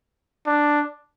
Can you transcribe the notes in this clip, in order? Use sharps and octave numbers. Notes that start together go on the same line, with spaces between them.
D4